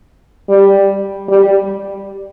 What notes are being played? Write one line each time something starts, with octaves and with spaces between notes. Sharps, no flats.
G3
G3